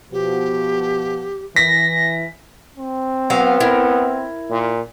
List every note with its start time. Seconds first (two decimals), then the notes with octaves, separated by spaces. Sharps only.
0.13 B2 F3 G4
1.56 E3 A#6 B6
2.78 C4
3.30 F#3 B3 F5 A#5
3.60 E4 A#4
4.50 A#2